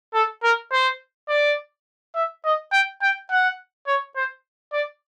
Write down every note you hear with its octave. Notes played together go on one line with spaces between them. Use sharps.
A4
A#4
C5
D5
E5
D#5
G5
G5
F#5
C#5
C5
D5